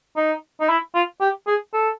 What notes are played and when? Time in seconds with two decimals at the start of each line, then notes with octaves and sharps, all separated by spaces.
0.16 D#4
0.61 D#4
0.69 E4
0.95 F4
1.21 G4
1.47 G#4
1.73 A4